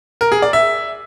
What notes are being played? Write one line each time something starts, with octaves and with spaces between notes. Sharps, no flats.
A#4
G#4
D5
E5